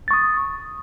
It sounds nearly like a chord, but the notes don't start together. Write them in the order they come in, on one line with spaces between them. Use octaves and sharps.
A6 C#6 D#6